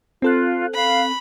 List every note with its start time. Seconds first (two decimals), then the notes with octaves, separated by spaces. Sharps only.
0.22 C4 F4 A4 F#6
0.75 F5 B5